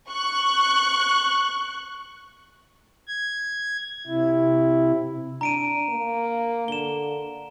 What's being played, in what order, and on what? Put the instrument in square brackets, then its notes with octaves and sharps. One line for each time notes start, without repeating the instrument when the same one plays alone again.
[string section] C#6 F#6
[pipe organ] G#6
C3 E4
[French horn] D4 [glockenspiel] A#5 D7 D#7
[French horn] A#3
[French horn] D3 [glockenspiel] E7 G7